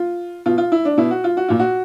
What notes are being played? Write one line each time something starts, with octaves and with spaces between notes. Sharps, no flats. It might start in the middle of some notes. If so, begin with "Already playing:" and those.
Already playing: F4
B2 F4
F4
E4
D4
B2 E4
F#4
F4
F#4
A#2 F4
F#4